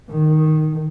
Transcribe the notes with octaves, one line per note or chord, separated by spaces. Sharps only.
D#3